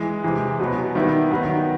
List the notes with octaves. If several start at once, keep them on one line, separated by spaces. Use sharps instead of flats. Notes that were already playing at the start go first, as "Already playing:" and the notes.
Already playing: E3 G#3
C3 E3 G#3
B2 F#3 B3
D#3 G3 B3 E4
D#3 F#3 B3